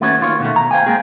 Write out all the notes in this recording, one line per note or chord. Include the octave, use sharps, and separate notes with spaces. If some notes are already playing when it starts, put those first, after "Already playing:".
D#2 A3 B3 C#4 F#4 C#5
D#3 F4 C#5
B2 D#3 A3
A#5
C5 F5 G5 G#5
G#3 A#3 C4 G#4